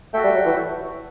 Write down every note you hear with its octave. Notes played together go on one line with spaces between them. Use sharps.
A3 F#4 A4 E5 G5
G3
F#3
E3